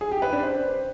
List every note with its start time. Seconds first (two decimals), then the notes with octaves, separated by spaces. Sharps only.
0.01 G#4
0.11 G4
0.22 B4
0.33 D4
0.43 C5